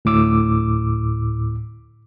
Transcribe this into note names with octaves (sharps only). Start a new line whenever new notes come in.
D2 A2 D6 E6